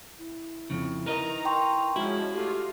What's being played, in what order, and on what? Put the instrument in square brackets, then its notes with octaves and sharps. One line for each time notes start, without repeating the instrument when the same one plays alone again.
[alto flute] E4
[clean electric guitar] F2 C#3
[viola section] D#3 D#4 A#5 [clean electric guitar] A#4 B4 D#5
[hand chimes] G5 C6 C#6
[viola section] F3 C#4 [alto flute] G#3 [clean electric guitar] E4 [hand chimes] F#4
[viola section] G#3 A3 F4 [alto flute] G4